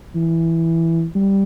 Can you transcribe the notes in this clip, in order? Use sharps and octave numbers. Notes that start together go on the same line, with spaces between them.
E3
G3